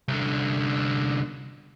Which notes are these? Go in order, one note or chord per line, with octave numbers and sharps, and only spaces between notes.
C2 D3